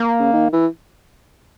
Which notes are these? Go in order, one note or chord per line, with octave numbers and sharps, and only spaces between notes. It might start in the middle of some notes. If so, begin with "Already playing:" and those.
Already playing: A#3
C#3
D#3
E3